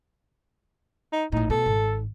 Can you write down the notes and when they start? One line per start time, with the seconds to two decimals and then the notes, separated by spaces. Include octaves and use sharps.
1.12 D#4
1.32 A1 A2 D#4
1.50 B2 A4
1.66 G#1